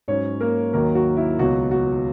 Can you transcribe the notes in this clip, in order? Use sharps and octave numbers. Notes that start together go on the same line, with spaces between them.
G#2 F#3 C#4 C#5
A#3 A#4
D#2 D#3 F#3 A#3 A#4
F#4
E4
C#2 B2 F#3 F#4
F#4